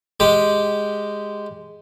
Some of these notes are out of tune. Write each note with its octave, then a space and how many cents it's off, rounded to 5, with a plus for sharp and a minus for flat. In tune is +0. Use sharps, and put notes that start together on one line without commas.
G#3 +0 G4 +0